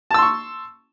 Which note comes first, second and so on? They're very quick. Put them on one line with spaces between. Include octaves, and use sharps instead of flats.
A5 E6 C6 C#6